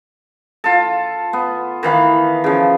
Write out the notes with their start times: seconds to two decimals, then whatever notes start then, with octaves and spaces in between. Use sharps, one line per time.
0.64 F4 A4
1.33 B3
1.83 D#3 E3 F5 B5
2.44 C#3 F3